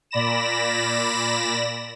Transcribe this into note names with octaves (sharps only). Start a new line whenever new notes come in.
A#2 D5 B5 A#6 E7